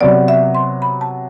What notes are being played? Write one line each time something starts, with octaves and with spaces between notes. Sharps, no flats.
C3 F#3 B3 D5
E5
C6
B5
A5